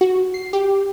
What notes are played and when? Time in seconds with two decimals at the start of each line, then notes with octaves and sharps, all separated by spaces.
0.01 F#4
0.34 C7
0.53 G4